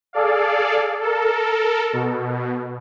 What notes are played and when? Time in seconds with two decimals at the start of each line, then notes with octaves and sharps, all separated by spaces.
0.13 G#4 A4 D5 F5
1.01 A4 A#4
1.93 B2